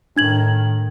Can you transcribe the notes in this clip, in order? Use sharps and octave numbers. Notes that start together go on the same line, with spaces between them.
A2 D#3 D4 G#6 F#7